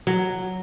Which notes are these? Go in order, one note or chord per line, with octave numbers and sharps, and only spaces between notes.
F#3